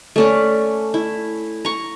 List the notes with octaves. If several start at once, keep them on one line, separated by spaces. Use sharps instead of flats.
A3 C#4 D5
E4
A#5 C#6